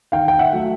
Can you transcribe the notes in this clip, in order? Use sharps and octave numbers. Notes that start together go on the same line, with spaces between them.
D#3 F5 G5
G5
E5 F#5
F#3 A3